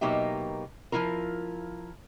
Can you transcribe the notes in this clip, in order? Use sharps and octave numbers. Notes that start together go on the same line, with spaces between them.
B2 F#3 A#3 D#4 G4 E5
F3 C#4 E4 F4 A#4